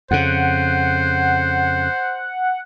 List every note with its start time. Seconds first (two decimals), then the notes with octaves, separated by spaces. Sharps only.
0.11 F2 C#3 C5 F#5